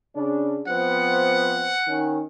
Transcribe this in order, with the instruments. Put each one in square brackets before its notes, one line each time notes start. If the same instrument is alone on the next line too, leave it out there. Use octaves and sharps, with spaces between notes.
[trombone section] C#3 D4
[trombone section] F3 B3 C4 [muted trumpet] F#5
[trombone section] D#3 C#4